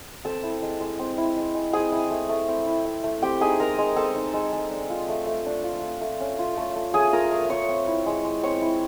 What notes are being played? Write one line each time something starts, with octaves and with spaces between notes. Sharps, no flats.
C4 A4 A5
E4
G#3
G#3
C4
E4
G#3
G#3
C4 G#4 G#5
E4
A3
A3
C4
E4
A3
A3
C4 G4 G5
D#4 G#4 G#5
G#3 A#4 A#5
G#3
C4 A4 A5
D#4
G#3
G#3
D4
F4
A3
A3
D4
F4
A3
A3
C#4
F4
A3
A3
C#4 G#4 G#5
F4 A#4 A#5
A3
A3 C#5 C#6
C4
E4
G#3
G#3
C4 C#5 C#6
E4